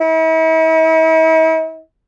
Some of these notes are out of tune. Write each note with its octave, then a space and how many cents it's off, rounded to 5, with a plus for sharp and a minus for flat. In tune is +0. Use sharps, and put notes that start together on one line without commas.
E4 -45